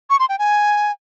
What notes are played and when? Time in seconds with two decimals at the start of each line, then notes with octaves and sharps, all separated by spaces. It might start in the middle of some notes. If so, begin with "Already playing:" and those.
0.10 C#6
0.20 C6
0.29 G5
0.39 G#5